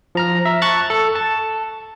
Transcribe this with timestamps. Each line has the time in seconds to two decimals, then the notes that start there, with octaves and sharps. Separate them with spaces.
0.15 F3 A#5 F6
0.45 E5 A#5
0.62 A5 C#6 F#6 A6
0.90 A4
1.15 A5